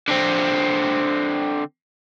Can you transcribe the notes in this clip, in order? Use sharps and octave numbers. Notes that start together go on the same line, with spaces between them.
D3 C4